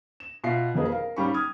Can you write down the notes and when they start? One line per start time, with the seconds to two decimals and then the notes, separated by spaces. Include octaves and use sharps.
0.20 E7
0.44 B2 F4 E5 C7
0.75 F1 F2 A#3 B3 G#4 D#5
0.92 A#4 F5
1.16 G#2 G3 C#4 F5 B5 C#6
1.34 D#6 F6 G#6